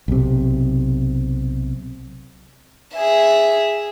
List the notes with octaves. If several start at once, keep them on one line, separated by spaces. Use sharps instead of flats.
B1 C3
G#4 E5